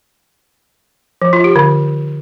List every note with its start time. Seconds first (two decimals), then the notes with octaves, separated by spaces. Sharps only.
1.22 F3
1.33 F4
1.44 G4
1.56 D3